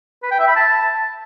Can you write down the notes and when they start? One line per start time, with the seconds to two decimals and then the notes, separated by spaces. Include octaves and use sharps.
0.23 B4
0.31 G5
0.39 E5
0.48 B5
0.56 A5